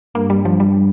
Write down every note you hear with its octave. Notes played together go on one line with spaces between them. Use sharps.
G2 A#3
G3
F3
G3